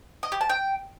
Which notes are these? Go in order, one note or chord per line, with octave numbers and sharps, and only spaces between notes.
D#5
G4
A5
G5